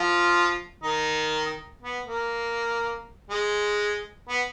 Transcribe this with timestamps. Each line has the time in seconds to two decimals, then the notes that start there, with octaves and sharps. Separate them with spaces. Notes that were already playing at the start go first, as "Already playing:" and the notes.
Already playing: F3 F4
0.83 D#3 D#4
1.82 B3
2.06 A#3
3.30 G#3
4.29 B3